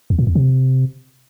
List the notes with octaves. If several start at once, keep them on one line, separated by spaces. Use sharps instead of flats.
E2
A#2
E2
C3